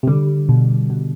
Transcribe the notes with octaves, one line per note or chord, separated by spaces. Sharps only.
C3
D3 G3
B2
B2